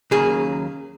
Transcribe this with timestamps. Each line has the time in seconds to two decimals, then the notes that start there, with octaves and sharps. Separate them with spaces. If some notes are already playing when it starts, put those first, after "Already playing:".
0.11 D#2 C#3 F#3 A#3 G#4